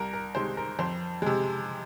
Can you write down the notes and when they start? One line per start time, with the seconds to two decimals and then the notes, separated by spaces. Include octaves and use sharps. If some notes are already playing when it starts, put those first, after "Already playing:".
Already playing: C2 A#4
0.13 A#4
0.35 C3 D#3 G#3 C5
0.57 A#4
0.79 F2 C5
1.22 C3 G#3